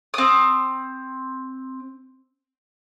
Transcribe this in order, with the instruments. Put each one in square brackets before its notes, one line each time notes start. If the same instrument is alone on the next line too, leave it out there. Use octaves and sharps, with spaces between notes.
[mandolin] C4 D#6